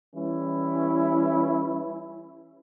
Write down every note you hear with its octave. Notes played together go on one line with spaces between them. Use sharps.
E3 G3 C#4 E4